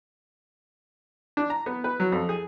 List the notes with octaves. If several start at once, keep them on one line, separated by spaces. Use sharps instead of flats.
D4
A#5
B3
B4
F#3
F2
G#4